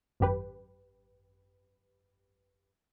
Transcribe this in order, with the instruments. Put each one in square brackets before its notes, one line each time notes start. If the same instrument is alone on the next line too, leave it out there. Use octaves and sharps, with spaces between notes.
[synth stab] G#1 F#2 G4 B4